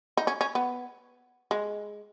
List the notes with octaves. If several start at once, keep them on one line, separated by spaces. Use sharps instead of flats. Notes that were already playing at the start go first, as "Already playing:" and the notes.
D#4
C#4
C#4
B3
G#3